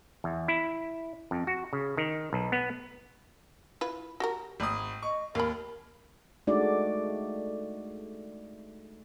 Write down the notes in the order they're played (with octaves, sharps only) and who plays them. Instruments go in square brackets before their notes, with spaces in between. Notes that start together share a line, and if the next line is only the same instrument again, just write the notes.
[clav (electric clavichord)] E2
E4
F2
F#4
C#3
D#3
B1
B3
[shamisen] E4 F4 B4
F#4 G4 A#4
[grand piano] G#1 D#6
[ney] D#5 [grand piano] C#6
[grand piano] D#2 [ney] A#4 [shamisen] F5 B5
[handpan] G#3 A3 D4 D#4 F#4 D5